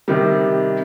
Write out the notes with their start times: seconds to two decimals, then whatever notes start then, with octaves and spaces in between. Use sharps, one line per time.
0.08 C3 D#3 G3